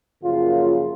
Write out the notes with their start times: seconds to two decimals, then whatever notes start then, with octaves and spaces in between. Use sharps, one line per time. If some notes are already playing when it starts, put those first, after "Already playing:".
0.24 F#2 C#3 F3 A#3 F4